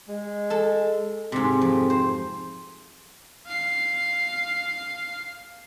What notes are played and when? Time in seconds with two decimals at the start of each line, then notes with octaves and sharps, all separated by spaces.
0.08 G#3
0.50 A4 A5
1.32 G#2 C3 C4
1.61 F2
1.90 C5
3.45 F5 C7